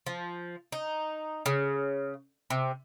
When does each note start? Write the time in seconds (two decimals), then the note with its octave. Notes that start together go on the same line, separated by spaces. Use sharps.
0.06 F3
0.72 D#4
1.46 C#3
2.50 C3